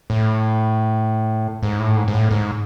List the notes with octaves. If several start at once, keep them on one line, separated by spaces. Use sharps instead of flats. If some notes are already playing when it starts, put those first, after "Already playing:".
A2
G#2
A2
G#2
G#2
A2
G#2